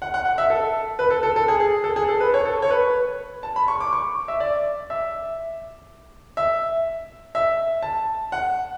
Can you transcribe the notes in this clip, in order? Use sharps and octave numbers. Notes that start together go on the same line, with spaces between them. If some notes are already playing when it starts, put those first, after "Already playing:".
F#5
F#5
F#5
E5
A4
B4
A4
A4
A4
G#4
G#4
A4
G#4
A4
B4
C#5
A4
C#5
B4
A5
B5
C#6
D6
C#6
E5
D5
E5
E5
E5
A5
F#5